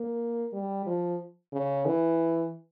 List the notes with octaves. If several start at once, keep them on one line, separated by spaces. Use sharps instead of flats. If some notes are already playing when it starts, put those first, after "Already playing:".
Already playing: A#3
G3
F3
C#3
E3